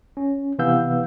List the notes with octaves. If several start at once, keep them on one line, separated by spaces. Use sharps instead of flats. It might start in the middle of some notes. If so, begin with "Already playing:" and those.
C#4
C3 E3 B3 F5 E6 G6